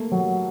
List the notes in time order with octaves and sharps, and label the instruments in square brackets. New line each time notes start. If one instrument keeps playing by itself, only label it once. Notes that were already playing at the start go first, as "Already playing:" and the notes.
Already playing: [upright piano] A3 [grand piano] A#3
[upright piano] F#3